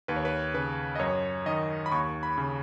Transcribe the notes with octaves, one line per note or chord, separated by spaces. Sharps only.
D#2 B4
C#5
B4
C#3 B4
D#5
F#2 C#5
D#3 D#5
B5
D#2 C#6
B5
C#3